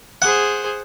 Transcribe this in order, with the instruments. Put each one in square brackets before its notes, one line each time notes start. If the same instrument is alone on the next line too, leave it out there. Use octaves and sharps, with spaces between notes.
[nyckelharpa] G#4 C5 [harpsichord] F#5